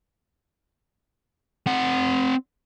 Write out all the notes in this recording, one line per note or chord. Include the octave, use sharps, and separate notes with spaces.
C4 F#5